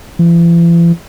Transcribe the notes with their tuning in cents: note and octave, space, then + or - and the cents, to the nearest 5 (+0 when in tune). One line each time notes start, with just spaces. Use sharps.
E3 +45